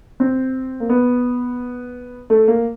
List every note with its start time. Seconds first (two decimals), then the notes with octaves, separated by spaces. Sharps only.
0.20 C4
0.80 A#3
0.89 B3
2.30 A3
2.48 A#3